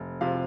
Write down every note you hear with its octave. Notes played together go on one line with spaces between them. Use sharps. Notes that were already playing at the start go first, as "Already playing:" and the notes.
Already playing: F1
C3 F3 F5